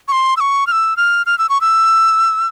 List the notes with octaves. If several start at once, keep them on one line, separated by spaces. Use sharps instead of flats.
C#6
C6
E6
C#6
F6
E6
F6
F6
E6
C#6
E6